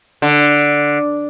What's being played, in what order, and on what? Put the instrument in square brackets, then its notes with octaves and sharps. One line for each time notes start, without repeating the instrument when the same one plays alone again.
[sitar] D3